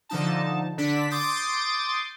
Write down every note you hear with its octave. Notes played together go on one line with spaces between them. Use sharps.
D3 F3 D#4 A5
D3 D4 B6
C6 D6 D#6 G6 A6 C7